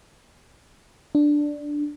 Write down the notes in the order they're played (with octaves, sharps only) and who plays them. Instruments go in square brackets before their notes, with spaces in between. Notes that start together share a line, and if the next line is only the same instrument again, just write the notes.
[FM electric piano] D4